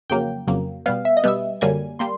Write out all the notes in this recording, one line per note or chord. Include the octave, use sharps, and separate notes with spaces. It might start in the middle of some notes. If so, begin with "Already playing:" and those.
F2 C#3 F#3 A#3 G5
F2 C#3 F#3 A#3
B2 G3 B3 F5
E5
D#5
B2 G3 B3 E5
F#2 D3 G3 A#3 G#5
G3 A#3 C6